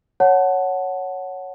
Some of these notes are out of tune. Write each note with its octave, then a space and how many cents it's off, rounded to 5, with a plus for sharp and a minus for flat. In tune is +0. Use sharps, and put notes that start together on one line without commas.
C#5 +0 F#5 +0 A5 +0